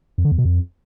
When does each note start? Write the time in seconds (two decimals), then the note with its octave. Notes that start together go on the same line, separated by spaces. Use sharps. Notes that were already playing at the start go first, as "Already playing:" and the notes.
0.18 F2
0.25 D3
0.32 E2
0.38 B2
0.45 F2